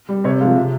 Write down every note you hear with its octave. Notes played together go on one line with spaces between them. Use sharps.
G3
C3 C#5
F3 G#3 F5
C3 E5